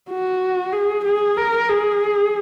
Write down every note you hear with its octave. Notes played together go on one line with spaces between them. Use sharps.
F#4
G#4
G#4
A#4
G#4